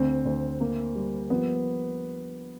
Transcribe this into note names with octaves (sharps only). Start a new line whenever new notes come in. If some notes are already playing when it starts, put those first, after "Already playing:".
Already playing: D2 C4
D2
A#3
G3
F3 B3